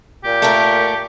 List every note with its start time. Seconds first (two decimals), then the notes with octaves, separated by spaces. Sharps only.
0.24 A#2 G4
0.42 A3 A#4